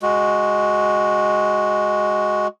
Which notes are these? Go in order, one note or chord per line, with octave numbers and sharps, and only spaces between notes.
G#3 F#4